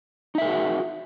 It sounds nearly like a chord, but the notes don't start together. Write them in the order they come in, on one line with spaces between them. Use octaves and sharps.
D#4 E5 A#4 G#4 F#4